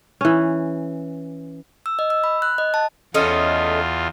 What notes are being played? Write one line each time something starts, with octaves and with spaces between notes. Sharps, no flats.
E3 C#4
E6
D#5
E6
B5
F#6
D#5
A5
E2 A3 C#4 F4 D#5